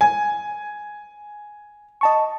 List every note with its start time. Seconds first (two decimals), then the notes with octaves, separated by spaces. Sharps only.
0.01 G#5
2.01 D#5 A5 C#6